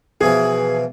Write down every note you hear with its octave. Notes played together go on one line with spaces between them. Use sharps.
B2 E3 F3 G#4